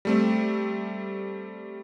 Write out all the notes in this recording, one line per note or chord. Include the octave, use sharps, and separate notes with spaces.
G3 A3 C4